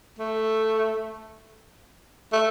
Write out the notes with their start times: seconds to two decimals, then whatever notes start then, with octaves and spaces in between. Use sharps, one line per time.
0.19 A3
2.32 A3